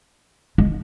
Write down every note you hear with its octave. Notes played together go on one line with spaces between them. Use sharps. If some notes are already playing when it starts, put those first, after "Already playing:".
G#3